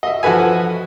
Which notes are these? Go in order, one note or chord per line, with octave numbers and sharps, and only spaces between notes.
D#5 E5
F3 F#4 A4 B4 G#5